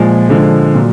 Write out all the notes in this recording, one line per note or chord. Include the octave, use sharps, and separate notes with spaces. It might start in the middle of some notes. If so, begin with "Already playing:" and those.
Already playing: A#2 F3 G#3
D3 F3 G#3
A#2 F#3